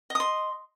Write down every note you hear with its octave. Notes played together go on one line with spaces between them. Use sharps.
D#5 C6 D#6